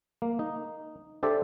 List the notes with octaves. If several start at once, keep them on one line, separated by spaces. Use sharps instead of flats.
A#3
D#4
D4 G4 A4 C5 D5 E5